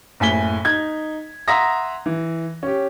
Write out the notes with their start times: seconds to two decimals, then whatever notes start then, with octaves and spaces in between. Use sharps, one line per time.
0.20 F#1 A2 G#5 B6 G7
0.65 D#4 G#6
1.48 E5 F#5 A#5 C6 D#6 A#6
2.06 E3
2.63 C#4 G4